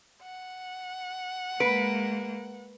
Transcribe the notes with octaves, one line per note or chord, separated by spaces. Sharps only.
F#5
G#3 A#3 B4 D7